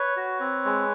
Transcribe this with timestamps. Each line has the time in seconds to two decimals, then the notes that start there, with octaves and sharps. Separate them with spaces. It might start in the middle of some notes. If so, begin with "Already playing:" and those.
Already playing: B4 C#5
0.17 F#4
0.40 C4
0.65 G#3